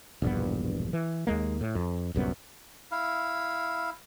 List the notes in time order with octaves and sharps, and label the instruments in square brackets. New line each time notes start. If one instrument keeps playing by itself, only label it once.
[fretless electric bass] E1 A#1 G2 B3
E3
D#2 G#3 A#3
A2
F2
D1 C2 F#2 B3
[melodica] E4 F5